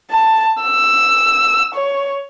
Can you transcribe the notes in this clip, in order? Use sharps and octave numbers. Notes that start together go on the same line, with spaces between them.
A5
E6
C#5